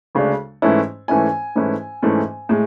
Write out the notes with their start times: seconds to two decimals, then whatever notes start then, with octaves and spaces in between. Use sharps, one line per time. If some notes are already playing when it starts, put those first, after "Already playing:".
0.15 D2 C#3 G#3 D4
0.62 G#2 E3 A3 C#4 E4
1.08 G#2 E3 A3 C#4 E4 G#5
1.56 G#2 E3 A3 C#4 E4
2.02 G#2 E3 A3 C#4 E4
2.49 A2 G#3